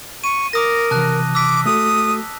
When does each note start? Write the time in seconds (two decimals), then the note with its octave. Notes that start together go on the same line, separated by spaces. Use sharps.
0.24 C#6 D#7
0.53 A#4 D6 D#6 A#6
0.91 C3 E3 A5 F#6
1.35 D6 E6 B6
1.66 A3 F#4 A4 D#6